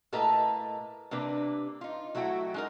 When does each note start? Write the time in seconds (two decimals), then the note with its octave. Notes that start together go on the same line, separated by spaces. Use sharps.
0.13 A2 A#3 A4 B4 D#5 A#5
1.11 C3 A#3 D4 B4
1.81 D#4 F4
2.15 F#3 A3 E4 F#4 G5
2.54 G#3 D#4 A#4